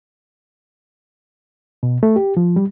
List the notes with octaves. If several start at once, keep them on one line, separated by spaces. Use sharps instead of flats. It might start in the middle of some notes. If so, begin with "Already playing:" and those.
B2
A3
G4
F3
G3